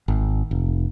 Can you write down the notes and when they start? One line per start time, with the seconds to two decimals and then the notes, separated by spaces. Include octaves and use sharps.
0.08 G#1
0.51 F1